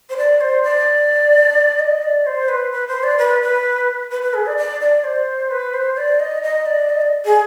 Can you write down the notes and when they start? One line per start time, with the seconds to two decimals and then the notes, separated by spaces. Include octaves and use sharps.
0.09 C5
0.17 D5
0.41 C5
0.63 D5
1.79 D#5
2.03 D5
2.26 C5
2.49 B4
2.72 B4
2.88 C5
3.03 D5
3.18 B4
3.42 B4
4.11 B4
4.22 B4
4.34 G#4
4.46 D5
4.57 D5
4.81 D5
5.04 C5
5.51 B4
5.74 C5
5.97 D5
6.19 D#5
6.43 D#5
6.66 D5
6.90 D#5
7.01 D5
7.25 G#4